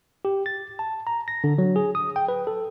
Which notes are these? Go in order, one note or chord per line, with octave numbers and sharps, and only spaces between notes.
G4
A6
A5
A#5
A#6
D3
F#3
G#4
D#6
G5
B4
A4